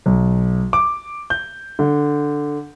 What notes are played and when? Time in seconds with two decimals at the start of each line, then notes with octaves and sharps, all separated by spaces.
0.06 B1
0.73 D6
1.30 G6
1.79 D3